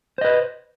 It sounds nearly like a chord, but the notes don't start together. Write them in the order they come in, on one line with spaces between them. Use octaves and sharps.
C5 D#5 B4